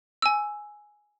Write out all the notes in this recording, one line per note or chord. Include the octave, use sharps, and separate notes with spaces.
G#5 E6